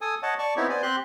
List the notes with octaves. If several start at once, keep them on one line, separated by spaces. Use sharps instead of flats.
A4 G#5 D#6
C#5 D#5 F#5 A5
D5 A5 C#6
B3 C4 D#4 E4 G4 C#5
B3 C5 D5 G#5
C4 G4 C5 C6 F#6